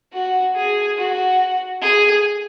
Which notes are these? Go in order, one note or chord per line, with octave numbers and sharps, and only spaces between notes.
F#4
G#4
F#4
G#4